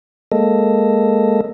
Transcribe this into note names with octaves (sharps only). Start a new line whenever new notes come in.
G#3 A#3 A4 D#5